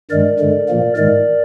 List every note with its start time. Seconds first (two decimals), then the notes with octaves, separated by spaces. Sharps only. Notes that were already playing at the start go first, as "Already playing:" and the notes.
0.10 G2 D#3 G#3 A#4 D5
0.39 G2 D3 G#3
0.68 A#2 F3 A#3
0.97 G#2 D#3 G#3 A#4 D5